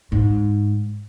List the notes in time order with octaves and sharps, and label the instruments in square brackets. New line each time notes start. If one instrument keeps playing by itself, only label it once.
[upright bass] G#2